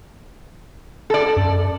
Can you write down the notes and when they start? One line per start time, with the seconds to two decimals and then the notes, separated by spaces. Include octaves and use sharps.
1.10 A4 D5
1.36 F#2